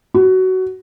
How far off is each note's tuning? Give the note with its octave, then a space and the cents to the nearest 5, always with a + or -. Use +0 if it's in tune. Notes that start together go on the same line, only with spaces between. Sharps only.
F#4 +15